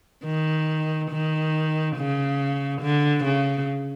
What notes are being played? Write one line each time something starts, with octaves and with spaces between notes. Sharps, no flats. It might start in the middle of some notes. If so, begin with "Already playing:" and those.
D#3
D#3
C#3
D3
C#3